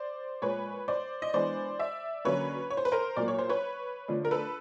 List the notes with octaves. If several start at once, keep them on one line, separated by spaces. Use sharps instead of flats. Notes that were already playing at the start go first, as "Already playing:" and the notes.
Already playing: C5 D5
A#2 F3 G#3 B4 C#5
C5 D5
D#5
E3 G#3 B3 D4 C5 D5
D5 E5
D3 F#3 A#3 C#4 B4 C#5
C#5
C5
B4
A#4 C5
A#2 F#3 A#3 D5
C#5
C5
B4 C#5
D3 F3 A3 D4
A#4
A4 B4